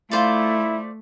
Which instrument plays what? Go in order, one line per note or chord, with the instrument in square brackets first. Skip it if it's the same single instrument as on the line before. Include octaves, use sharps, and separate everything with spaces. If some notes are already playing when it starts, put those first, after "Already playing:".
[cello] A3 [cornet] E4 [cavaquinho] F4 C5 D5